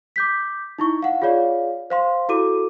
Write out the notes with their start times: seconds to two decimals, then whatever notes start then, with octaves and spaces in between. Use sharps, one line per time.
0.16 D6 G6 B6
0.79 D#4 E4 C#6
1.02 F5 F#5
1.22 F4 G#4 C#5 D5 F5
1.90 C5 F5 C6
2.29 E4 F#4 A4 D6 D#7